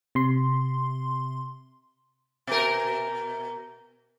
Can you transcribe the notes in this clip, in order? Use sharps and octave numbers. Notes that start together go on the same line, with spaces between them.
C3 C6
B2 A#4